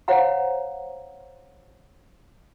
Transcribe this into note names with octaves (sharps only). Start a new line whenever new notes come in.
C5 C#5 F5 F#5 A#5